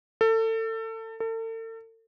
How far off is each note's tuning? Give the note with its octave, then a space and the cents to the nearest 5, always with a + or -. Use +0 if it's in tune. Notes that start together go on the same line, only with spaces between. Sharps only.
A4 +30
A4 +40